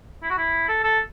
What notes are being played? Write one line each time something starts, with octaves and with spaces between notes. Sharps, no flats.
E4
F#4
E4
A4
A4